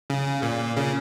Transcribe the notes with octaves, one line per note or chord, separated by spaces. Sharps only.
C#3
A#2
C#3